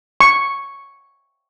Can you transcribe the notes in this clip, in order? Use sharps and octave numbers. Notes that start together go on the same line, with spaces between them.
C#6